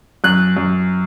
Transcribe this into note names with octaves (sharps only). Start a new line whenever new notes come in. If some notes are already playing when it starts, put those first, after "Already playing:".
F#2 F#6
F#2